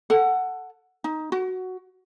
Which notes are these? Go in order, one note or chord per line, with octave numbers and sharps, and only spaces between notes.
A4 F#5
D#4
F#4